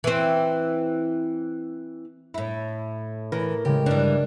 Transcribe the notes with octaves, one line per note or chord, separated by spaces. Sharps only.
E3 C4
A2 E4
E3 A#4
C#3 G#3 G4
G2 E3 D4